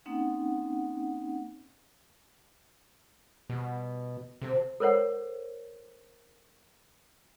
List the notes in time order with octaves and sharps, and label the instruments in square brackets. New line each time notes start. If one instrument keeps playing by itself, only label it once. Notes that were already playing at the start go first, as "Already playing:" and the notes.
[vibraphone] A#3 C4 C#4 D#4 F#5 G5
[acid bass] B2 [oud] G3
[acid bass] C3 [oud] C4 F#4 A4
[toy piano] A4 A#4 C5 C#5 F#5